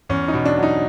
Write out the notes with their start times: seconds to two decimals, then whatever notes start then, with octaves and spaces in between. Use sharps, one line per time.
0.09 E2 C#4
0.28 D#4
0.34 B2
0.45 D4
0.58 F#3
0.63 D#4